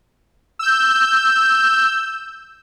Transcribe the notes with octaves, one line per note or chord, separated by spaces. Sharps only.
E6 G6